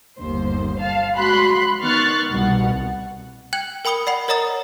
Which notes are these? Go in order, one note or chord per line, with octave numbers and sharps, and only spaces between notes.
G1 D#2 C5
F5 A5
G#3 F#4 B5 C6 F#6
D#3 B3 C#6 F6 F#6 A6
C2 B2 F#5
G5 F#6 G#6 F#7
A#4 G5 B5 D#6 C#7 G7
D5 F#5 B5
A#4 C#5 D#5 A#5 D#6 A6